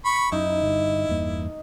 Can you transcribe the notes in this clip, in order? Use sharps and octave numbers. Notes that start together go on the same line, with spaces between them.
B5 C#6
F#2 D#4 E4
G1 G2
E2 G2 A#3